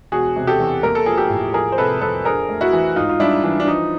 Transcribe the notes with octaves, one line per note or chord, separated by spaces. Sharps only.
E1 F#4 G#4
C3
G4 A4
E2
A#3 A#4
A4
F3 G#4
G4 A4
A2
F3 G#4 A#4
C5
C3 A4 B4
F2 A4 B4
D4 G#4 A#4
A3
E4 F#4
E3
G#2 D#4 F4
F4
G3 D4 E4
E3 D4
D4
F3 D#4